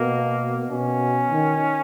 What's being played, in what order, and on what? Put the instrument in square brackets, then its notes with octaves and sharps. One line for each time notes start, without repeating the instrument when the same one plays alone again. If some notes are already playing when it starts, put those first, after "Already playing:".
Already playing: [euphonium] B2 [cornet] A#3
[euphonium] B2 [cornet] C#4
[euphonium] D#3